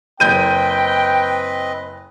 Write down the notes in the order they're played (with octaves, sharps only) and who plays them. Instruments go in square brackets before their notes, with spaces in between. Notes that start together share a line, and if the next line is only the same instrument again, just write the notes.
[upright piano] F#1 G6 D#7 [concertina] C4 B4 D#5 [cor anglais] G5